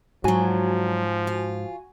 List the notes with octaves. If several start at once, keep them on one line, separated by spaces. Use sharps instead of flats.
G#2 F3 F#3 D4 F#4 G#5
F4